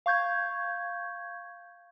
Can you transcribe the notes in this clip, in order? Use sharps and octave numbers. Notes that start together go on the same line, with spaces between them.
F5 C#6 G6 G#6